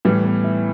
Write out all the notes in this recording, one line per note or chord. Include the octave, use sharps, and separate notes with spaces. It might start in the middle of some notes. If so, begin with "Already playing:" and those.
A2 E3 G3
B3
E4